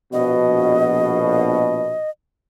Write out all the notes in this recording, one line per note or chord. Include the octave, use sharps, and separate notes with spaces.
A#1 B2 D#5